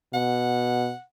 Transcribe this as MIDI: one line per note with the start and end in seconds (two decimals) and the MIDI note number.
0.14 0.92 47
0.14 1.02 78